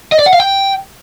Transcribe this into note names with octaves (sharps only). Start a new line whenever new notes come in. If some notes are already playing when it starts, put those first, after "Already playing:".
D#5
D5
F#5
F5
G5